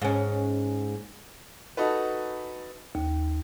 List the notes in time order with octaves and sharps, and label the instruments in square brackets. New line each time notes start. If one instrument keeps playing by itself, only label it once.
[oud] G#2 C#4
[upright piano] D#4 F#4 A4 B4
[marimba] D#2